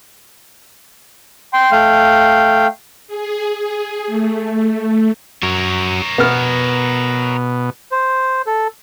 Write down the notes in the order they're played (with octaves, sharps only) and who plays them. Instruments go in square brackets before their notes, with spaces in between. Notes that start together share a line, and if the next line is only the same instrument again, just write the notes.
[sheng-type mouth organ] G5 C6
A3 F5 G5
[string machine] G#4
G#4
A3
[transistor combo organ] F#2 [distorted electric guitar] A#4 C#5
[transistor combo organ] B2 [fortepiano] B3 F6
[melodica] C5
A4